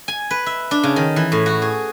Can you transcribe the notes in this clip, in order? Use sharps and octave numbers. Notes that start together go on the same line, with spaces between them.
G#5
B4
E5
D4
C#3
D#3
E3
A2
F#4
G#4